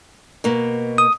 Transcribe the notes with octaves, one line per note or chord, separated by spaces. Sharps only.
B2 A#3
D#6